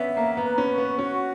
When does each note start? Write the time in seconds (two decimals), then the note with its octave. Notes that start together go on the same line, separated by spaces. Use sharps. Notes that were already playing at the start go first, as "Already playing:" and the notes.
Already playing: B3 C#4 D4 E5
0.17 A#3 A#5
0.37 B3
0.44 B4
0.58 C#4
0.72 C#6
0.78 B3
0.99 C#4 F#4